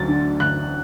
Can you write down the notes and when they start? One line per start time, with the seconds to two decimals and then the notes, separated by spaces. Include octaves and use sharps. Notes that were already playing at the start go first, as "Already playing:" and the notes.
Already playing: D2 F#3 A6
0.08 D3
0.40 D2 F#6